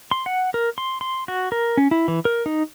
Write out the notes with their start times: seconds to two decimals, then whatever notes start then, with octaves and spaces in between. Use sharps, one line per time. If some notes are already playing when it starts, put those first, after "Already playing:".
0.11 C6
0.26 F#5
0.54 A#4
0.78 C6
1.01 C6
1.28 F#4
1.52 A#4
1.77 C#4
1.91 E4
2.08 E3
2.25 A#4
2.46 D#4